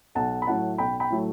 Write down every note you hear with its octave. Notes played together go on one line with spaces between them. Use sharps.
B1 F#5 A5
B5
A2 F#3 A3 F#5 A5
B1 G5 B5
G5 B5
A2 F#3 A3